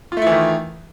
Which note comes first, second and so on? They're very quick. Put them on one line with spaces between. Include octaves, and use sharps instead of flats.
F4 A3 E4 E3 D#3